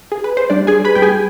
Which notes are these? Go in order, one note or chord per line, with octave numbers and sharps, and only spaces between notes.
G#4
B4
C5
G3 D4 D5
G#4 G#5
G3
B4 B5
G3 G5
G#4 G#5